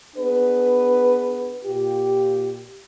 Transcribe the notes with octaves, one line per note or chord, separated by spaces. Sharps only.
B3 D4 G#4 B4
A#2 F4 G4